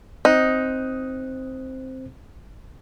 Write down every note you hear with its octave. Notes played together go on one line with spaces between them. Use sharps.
C4 D#4 C5 F#6